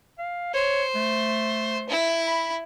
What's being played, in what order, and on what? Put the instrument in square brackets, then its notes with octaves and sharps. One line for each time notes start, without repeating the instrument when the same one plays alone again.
[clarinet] F5
[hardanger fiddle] C5 [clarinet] C#5
[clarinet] A3
[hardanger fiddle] E4
[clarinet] B5